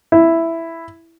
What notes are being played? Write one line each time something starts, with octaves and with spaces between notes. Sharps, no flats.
E4